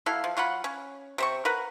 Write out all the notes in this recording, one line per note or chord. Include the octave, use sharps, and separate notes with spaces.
F#3 E4 A4 F5
F3
F#3 F4 F#5 B5
C#4
C3 C5 C#6
A#4 B4 F#5